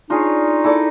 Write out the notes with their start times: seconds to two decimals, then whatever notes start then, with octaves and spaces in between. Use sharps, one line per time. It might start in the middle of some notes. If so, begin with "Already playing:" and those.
0.10 D4 D#4 F4 G#4 C#5
0.64 E4 A4 D5